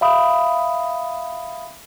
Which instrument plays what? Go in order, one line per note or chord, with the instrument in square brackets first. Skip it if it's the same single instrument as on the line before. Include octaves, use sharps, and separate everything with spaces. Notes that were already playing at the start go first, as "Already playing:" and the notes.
[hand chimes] E5 F5 B5 D#6